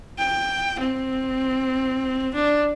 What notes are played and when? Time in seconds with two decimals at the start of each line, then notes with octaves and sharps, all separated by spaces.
0.19 G5
0.80 C4
2.34 D4